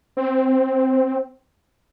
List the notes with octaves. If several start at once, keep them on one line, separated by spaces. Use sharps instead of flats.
C4